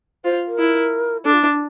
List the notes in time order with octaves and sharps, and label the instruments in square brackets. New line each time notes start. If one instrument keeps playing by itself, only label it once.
[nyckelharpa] F4 [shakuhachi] C5
[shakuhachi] A#4
[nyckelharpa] E4
[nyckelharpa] D4 [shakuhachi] A4
[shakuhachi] F4
E4
D4